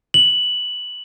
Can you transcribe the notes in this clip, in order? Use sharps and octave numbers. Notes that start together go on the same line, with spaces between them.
F#7